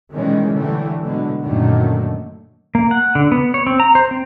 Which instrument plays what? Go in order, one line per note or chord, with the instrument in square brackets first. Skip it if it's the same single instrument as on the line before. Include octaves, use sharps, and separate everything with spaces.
[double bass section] B2 D#3 E3 G3 G#3 C#4
D3 E3 G3 A3
B2 D3 F#3 G#3 A3
F#2 A#2 D3 D#3 F#3 A3
[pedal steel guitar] A#3
F#5
D3
B3
C#5
C4
A#5
C5
C4